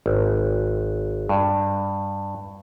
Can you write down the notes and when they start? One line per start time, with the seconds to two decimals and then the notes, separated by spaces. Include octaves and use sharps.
0.06 G#1
1.29 G2